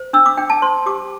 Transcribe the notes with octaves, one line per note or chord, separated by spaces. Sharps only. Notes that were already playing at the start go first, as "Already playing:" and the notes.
Already playing: C5
D4 E6
D6
D4 G5
A5
C5 C6
G4 D6